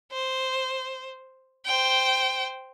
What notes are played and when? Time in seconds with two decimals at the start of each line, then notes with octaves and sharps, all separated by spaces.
0.12 C5
1.65 C5 G5